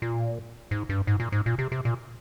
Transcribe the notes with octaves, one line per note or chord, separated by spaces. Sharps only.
A#2
G#2
G2
G#2
A#2
G#2
A#2
C3
C3
A#2